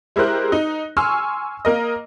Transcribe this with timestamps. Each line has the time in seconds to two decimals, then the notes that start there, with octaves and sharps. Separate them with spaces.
0.16 G#3 E4 G4 A#4 C5 F#6
0.52 D#4
0.97 G#5 C6 C#6 E6 F6
1.65 A#3 A#4 D#5